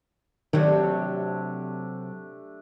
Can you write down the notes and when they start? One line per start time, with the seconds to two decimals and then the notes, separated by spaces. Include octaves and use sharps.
0.53 C3 D#3 F#3 A3 D4 G4